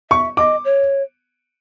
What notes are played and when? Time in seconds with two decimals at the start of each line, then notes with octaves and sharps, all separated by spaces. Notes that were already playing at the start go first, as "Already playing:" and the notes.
0.10 E5 C#6
0.37 D#5 D6
0.65 C#5